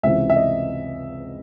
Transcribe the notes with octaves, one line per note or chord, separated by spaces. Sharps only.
C#2 C3 E3 E5
E5
D#5